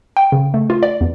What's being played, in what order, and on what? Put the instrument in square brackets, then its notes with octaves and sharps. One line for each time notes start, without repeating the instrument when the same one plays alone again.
[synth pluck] G5
C#3
A3
F4
D5
E2